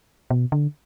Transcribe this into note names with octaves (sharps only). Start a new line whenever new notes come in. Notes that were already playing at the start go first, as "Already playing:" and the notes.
B2
D3